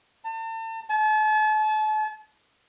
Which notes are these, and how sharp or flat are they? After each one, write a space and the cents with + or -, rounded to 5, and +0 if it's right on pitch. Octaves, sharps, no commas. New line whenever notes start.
A5 +40
A5 -40